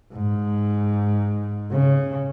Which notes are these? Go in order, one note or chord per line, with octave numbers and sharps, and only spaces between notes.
G#2
C#3